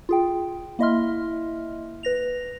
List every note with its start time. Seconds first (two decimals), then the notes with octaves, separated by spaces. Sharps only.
0.09 F4 G#4 G5
0.79 A#3 E4 D#5 E5 C6 F6
2.03 B4 A#6 F7